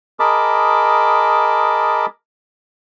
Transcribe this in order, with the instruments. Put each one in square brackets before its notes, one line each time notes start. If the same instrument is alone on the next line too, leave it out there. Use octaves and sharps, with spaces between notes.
[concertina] G#4 A#4 D#5 A5 B5 D6